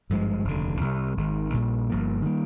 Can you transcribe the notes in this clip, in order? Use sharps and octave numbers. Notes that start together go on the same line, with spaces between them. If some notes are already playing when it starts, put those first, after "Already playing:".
G#1 G2 F3 G#3
F1 D#2 D3
C2 C3 G3
G#1 G#2 D#3
A#1 A#2 G3
G1 G2 F3 A#3
D#3 G3 A#3